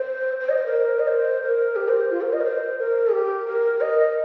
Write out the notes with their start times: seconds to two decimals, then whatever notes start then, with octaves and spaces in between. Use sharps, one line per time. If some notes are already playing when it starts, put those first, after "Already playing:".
Already playing: C5
0.40 C5
0.49 D#5
0.57 C5
0.66 A#4
0.99 D#5
1.08 C5
1.43 A#4
1.76 G4
1.88 C5
2.11 F4
2.21 A#4
2.33 D#5
2.41 A#4
2.45 C5
2.79 A#4
3.12 G4
3.47 A#4
3.81 D#5